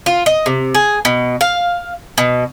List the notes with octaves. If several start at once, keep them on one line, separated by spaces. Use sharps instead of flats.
F4
D#5
C3
G#4
B2
F5
B2